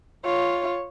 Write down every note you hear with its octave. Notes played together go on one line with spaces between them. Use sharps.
F4 C#5